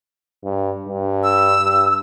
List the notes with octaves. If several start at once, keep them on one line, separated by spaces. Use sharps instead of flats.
G2
G2
E6
G2